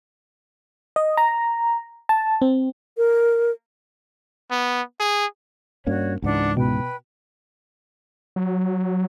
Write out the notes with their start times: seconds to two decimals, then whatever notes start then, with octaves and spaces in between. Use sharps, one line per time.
0.96 D#5
1.17 A#5
2.09 A5
2.42 C4
2.98 A#4
4.51 B3
5.00 G#4
5.87 G2 A#3 C#4 F#4 C#5 D5
6.22 C#2 G#2 E3 D4 F#5
6.57 B2 B4 G5
8.36 F#3